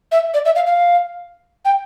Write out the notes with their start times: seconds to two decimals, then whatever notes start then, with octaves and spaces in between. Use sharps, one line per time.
0.11 E5
0.34 D5
0.45 E5
0.55 F5
0.66 F5
1.65 G5